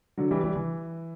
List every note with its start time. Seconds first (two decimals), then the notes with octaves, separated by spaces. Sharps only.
0.18 D3 F#3
0.31 E3 G3
0.44 E3 G3
0.55 E3